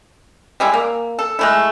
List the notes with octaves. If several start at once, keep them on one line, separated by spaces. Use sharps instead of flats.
G3 G#3 E4
A#3
A4
G#3 A3 E4